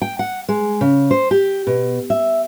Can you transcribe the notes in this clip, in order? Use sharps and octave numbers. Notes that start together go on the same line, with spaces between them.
G5
F#5
G#3
C#3
C5
G4
B2
E5